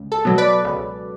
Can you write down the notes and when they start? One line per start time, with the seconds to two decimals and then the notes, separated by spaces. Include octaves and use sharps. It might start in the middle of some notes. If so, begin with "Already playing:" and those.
Already playing: C#2
0.12 A4
0.25 B2 F#3
0.38 B4 D5
0.64 C#2